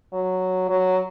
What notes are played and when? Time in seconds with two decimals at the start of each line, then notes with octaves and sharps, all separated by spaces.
0.14 F#3
0.70 F#3